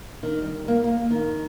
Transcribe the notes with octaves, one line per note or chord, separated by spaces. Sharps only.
D#3
G3
A#3
A#3
D#3